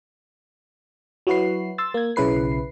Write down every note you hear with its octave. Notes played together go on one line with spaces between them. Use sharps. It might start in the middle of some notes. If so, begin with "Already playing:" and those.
F#3 E4 F#4 B4 C7
C6 E6 A6
A#3 G#6
B1 C#3 E4 B4 C7